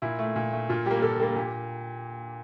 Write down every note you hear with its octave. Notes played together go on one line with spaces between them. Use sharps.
A#2 E4
A3
A#2
A3
A#2 F4
G3 A#3 G4
A#2 A4
G3 A#3 A4
A#2 G4